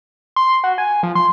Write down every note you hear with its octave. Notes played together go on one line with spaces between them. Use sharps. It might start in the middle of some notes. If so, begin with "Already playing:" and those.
C6
F#4
G#5
F3
C6